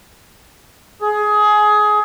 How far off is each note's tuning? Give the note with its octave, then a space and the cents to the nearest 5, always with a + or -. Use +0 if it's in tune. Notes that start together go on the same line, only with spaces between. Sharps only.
G#4 +20